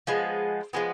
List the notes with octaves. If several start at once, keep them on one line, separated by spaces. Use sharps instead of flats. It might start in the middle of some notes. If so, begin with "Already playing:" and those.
F3 G#3 B3
F3 G#3 B3